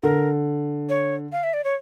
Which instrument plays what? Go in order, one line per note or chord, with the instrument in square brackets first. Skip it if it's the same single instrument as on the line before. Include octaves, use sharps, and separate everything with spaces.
[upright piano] D3 [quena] A#4
[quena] C#5
F5
E5
D5
C#5